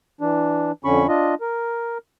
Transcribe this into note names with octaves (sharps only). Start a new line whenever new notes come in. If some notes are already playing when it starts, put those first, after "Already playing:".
E3 D4
F2 D3 C#4 B5 C#6
D4 F4 D#5
A#4